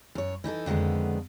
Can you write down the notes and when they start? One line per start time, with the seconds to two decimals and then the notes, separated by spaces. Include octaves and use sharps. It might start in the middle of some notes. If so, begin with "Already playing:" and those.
0.15 F#2 C#5
0.44 E3 D#4 E4 A4
0.66 F2 D3 D#3 G#3 B3